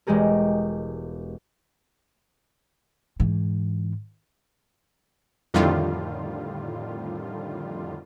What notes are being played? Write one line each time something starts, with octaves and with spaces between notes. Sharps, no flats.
E1 G#3 G4 G#4 A#4
G#2 E3
F2 A2 D3 D#3 G3 F4